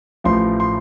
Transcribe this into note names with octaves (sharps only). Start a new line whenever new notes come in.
A1 A2 F3 C6
C6